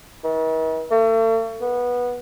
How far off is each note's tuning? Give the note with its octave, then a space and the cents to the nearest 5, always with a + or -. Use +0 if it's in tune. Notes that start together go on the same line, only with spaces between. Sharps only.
D#3 +45
A3 +40
B3 -15